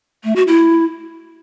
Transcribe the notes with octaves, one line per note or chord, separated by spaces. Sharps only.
A3
F#4
E4